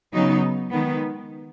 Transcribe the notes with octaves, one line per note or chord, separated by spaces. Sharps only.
C#3 F#3 B3 D#4
D#3 G#3 B3